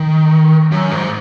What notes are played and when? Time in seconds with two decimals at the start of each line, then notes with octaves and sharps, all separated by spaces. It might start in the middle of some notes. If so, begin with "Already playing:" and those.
Already playing: D#3
0.71 F#2
0.91 G#2